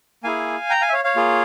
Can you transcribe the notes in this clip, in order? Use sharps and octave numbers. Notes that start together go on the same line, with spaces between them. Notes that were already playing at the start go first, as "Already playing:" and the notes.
A#3 E4 G#4 F5 G#5
G5 A#5
F5 G#5
E5
C#5 F5
C#5 F5
A#3 F4 G#4